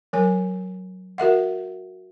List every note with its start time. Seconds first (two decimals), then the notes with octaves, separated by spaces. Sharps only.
0.13 F#3 A#4 G#5
1.18 F#4 A#4 E5 F#5